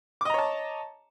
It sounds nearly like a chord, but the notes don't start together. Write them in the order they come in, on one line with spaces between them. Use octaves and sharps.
D6 D#5 A#5 C#5 A5